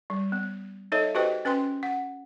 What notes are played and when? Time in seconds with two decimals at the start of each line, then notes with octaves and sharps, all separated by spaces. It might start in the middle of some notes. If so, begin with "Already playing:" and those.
0.10 G3
0.32 B3
0.92 D#4 A4 C#5 D#5 E5
1.15 F#4 G4 B4 C5 D#5 G5
1.45 C#4 B4 G5 C6
1.83 F#5